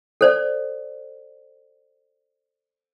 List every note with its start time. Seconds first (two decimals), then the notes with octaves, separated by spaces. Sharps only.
0.21 A4 C5 D5